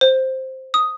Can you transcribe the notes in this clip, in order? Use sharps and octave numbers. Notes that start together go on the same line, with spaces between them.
C5
D#6